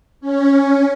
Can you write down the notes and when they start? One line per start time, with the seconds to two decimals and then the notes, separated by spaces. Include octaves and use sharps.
0.21 C#4